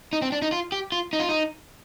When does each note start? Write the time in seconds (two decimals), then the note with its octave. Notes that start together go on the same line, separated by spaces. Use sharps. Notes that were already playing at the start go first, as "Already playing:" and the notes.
0.13 D#4
0.22 C4
0.32 D4
0.42 D#4
0.52 F4
0.72 G4
0.92 F4
1.13 D#4
1.20 F4
1.29 D#4